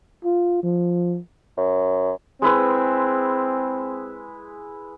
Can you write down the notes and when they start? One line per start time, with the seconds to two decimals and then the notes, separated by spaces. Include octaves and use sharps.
0.25 F4
0.63 F3
1.58 F#2
2.42 G#3 C4 E4 B4